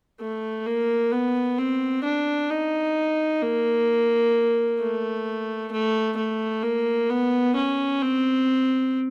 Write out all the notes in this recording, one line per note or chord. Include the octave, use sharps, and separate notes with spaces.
A3
A#3
B3
C4
D4
D#4
A#3
A3
A3
A3
A#3
B3
C#4
C4